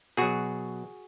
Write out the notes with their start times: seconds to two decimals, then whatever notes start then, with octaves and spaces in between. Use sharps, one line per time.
0.17 B2 F#3 F#4 G#4